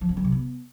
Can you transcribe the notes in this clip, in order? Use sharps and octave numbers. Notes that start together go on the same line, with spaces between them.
F3
C4
F#3
C3
B3